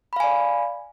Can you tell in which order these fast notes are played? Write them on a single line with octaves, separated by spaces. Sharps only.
B5 F5 G#5 D5